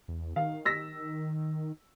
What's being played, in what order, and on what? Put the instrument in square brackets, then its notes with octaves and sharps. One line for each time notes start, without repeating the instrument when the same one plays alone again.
[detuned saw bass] E2
[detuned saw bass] D#3 [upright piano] F5
[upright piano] E6 A#6 B6